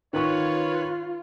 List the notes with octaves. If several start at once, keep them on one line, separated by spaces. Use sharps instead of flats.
D#3 F4 B4 C#5 C#6